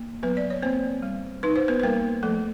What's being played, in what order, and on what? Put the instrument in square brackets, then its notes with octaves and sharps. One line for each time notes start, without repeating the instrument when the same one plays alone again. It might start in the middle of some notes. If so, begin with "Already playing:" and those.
Already playing: [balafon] A#3
F#3 B3 B4
D5
C#5
A#3 C4 C5
G3
D#4 B4
C5
B3 B4
B4
G3 A#3 A#4
F3 A3 A4